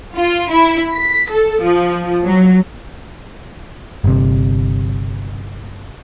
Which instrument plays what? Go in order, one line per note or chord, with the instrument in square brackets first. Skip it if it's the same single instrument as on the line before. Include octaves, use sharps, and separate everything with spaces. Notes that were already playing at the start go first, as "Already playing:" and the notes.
[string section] F4
E4
B6
A4
F3
F#3
[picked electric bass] G1 C3